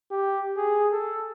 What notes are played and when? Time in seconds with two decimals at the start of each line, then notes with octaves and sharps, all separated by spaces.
0.11 G4
0.57 G#4
0.92 A4